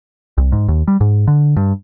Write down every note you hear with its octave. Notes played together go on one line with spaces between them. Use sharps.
C2
G#2
D#2
G3
G#2
D3
G2